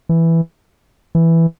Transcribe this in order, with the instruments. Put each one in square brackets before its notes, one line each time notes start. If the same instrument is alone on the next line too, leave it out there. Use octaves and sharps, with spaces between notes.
[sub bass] E3
E3